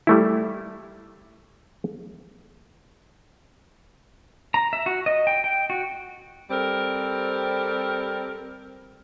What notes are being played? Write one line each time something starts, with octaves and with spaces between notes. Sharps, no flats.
G3 A3 E4
A#5
E5
F#4
D#5
G5
G5
F#4
G3 C4 A4 A#4